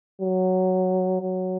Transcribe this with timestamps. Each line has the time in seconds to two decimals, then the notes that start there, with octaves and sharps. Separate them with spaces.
0.22 F#3
1.22 F#3